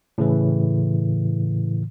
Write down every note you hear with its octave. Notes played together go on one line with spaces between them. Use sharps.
A2 C#3 E3